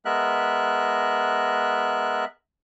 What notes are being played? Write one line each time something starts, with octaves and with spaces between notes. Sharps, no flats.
G#3 B3 A#4 E5 F#6